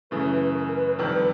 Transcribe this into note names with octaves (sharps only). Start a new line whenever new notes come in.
F#2 C#3 E3 A3 B4
B4
A#4
A#4
B4
F2 C3 D#3 G3 B4
B4